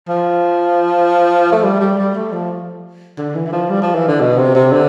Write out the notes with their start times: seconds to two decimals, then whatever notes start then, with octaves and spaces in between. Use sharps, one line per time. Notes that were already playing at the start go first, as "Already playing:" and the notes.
0.09 F3
1.52 A3
1.64 G3
1.81 G3
1.98 G3
2.15 A3
2.32 F3
3.18 D3
3.35 E3
3.46 E3
3.52 F3
3.70 G3
3.82 F3
3.95 E3
4.08 D3
4.21 B2
4.37 C3
4.55 C3
4.72 D3